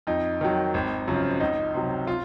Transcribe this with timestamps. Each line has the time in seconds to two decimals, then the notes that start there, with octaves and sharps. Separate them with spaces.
0.07 F2 D#4
0.41 D#3 F#3
0.74 G#1
1.08 F#2 C#3 F3
1.40 C#2 D#4
1.74 C3 F#3
2.07 F4